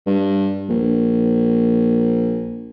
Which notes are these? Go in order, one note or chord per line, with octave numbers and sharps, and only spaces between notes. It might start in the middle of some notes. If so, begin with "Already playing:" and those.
G2
A#1